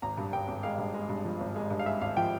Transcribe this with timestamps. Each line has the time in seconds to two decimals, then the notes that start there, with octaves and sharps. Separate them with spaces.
0.02 G#1 A#5
0.17 G2
0.33 G2 G5
0.48 G#1
0.63 G#3 F5
0.78 G2
0.94 G#3
1.09 G2
1.25 F3
1.40 G#1
1.56 G#3
1.70 G2
1.79 F5
1.86 G#3 E5
2.01 G#1 F5
2.17 F3 G5